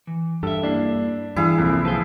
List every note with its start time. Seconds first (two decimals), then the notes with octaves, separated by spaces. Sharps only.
0.07 E3
0.43 G2 G4 A4 E5
0.63 A#3 D4 E4
1.36 G2 E3 E4 G#4 F5
1.58 C2 F2 A#2
1.85 F3 G#4 B4 C5